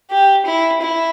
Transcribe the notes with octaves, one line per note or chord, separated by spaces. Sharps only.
G4
E4
E4